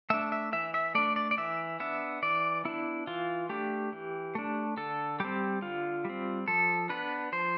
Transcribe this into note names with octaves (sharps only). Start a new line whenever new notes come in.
A3 D4 E5
E5
E3 E5
E5
A3 D4 D5
D5
D5
E3 E5
B3 D4 E5
E3 D5
B3 D4 E4
E3 F4
A3 D4 G4
E3
A3 D4
D3 A4
G3 C4 G4
D3 F4
G3 C4
F3 A4
B3 D4 B4
F3 C5